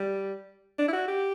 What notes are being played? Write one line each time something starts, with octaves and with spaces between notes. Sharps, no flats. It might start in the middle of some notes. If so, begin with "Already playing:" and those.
Already playing: G3
D4
E4
F#4
G4